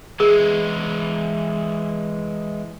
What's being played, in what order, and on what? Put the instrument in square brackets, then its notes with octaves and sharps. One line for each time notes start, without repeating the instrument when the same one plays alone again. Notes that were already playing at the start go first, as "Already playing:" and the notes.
[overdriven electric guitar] E3 G#3 [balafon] G#4